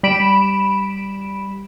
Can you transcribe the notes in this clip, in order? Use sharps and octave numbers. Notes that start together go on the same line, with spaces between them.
G3 B5 D7 E7